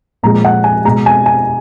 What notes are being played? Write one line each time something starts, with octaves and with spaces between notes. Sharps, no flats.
A#2 F3 G#3 A#5
F#5
G#5
B2 G#3 A#5
G#5
G#5